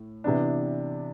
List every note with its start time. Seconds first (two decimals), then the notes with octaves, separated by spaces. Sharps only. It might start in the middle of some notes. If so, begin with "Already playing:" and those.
Already playing: A2
0.24 C3 E3 B3 D4